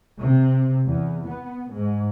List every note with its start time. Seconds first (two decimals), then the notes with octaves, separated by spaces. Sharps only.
0.20 C3
0.87 E2
1.28 B3
1.72 G#2